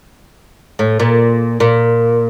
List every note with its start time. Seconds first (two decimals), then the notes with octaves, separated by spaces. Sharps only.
0.79 A2
1.00 A#2
1.60 A#2